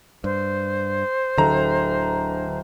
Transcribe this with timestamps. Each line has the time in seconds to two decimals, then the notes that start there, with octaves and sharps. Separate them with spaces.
0.24 G2 C5
1.38 D1 D3 A4 A#5